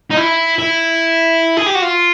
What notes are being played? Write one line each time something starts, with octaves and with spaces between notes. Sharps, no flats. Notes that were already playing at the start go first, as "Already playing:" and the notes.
D#4
E4
E4
G#4
G4
F#4
F4